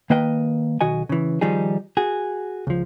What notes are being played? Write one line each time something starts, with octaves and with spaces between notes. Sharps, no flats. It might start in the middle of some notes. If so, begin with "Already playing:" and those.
D#3 A#3 B4 D#5 G5
B1 D#3 F#4 D#5 G#5
C#3 E3
D#3 F3 G3 D#4 G#4
F#4 G#4
C#2 F3